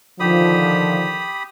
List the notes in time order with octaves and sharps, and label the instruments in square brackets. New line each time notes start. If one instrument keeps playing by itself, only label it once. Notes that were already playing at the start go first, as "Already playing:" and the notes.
[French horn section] D3 D#3 F3 [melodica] G4 B5 D#6